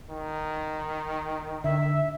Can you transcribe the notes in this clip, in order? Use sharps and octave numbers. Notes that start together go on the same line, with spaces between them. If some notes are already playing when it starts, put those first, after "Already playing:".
D#3
D3 E5